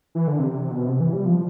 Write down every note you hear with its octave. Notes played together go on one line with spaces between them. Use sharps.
E3
D3
C3
C3
B2
C3
E3
G3
F3